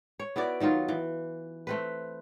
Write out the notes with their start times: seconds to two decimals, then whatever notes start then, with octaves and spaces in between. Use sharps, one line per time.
0.20 C#5
0.36 B3 E4 F#4 D5
0.60 D#3 F#3 D#4 F4
0.88 E3
1.67 A3 C4 B4